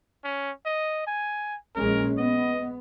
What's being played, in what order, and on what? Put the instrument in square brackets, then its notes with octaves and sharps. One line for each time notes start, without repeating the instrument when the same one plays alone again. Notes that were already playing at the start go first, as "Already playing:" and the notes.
[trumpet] C#4
D#5
G#5
[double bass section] A#1 G#3 C#4 [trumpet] A#4
[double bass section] B3 [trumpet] D#5